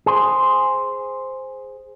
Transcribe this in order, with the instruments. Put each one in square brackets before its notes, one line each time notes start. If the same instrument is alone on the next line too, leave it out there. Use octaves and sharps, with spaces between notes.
[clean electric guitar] G#4 C5